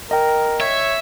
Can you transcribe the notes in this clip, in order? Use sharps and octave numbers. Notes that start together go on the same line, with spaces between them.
A#4 D#5 G5
C#5 E5